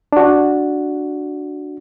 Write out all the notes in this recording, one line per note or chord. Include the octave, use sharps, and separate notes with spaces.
D4 F#4